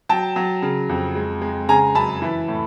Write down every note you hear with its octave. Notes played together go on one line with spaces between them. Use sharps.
F#3 G5 A5
F#3
C#3
F2
G#3
G#3
C#3 G#5 A#5
F#2 A5 B5
E3
A2